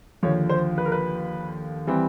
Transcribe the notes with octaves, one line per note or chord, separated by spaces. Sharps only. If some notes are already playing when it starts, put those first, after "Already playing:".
D#2 D3 F3 C#5
C5
B4
A#4
B4
E3 G3 C4